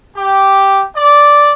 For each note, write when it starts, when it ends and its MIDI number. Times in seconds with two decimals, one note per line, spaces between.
0.16 0.83 67
0.96 1.53 74